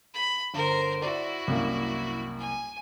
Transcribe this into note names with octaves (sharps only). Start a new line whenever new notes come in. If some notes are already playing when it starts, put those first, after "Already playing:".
B5
G1 A#4 C5
E4 F#4 D5
C2 F#2 A#3
G#5